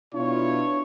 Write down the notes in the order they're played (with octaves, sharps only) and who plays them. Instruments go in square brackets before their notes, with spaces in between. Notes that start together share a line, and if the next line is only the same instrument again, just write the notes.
[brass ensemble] B2 E4 F4 [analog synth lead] D4 [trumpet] C#5